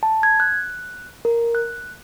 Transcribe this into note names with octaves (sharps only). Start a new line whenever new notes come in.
A5
G#6
F#6
A#4
F#6